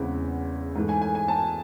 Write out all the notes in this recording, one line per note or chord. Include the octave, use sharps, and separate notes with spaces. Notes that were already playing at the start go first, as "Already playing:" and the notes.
Already playing: E2 C#3 G#3 C4 E4 F#5
G#2 E3 A3
G#5
G#5
G#5
A5